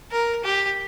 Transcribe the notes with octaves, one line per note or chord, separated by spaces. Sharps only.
A#4
G4